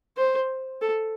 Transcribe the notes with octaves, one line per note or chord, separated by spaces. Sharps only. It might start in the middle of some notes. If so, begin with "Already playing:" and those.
C5
A4